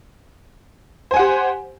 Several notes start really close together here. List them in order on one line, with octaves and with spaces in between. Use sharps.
C5 G#5 F#5 G4